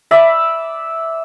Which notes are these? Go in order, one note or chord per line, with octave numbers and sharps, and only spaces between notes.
D5 E5 B5